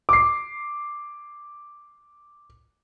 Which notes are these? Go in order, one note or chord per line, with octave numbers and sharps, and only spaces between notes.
D6 C7